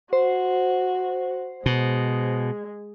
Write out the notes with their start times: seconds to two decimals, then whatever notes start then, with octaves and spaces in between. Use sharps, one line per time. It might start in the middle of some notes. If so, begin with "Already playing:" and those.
0.13 F#4 C5
1.66 B2 G#3